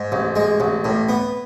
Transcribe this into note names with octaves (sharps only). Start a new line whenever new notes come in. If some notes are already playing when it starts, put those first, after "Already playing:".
Already playing: G#2
A1
G#3
A1
A2
B3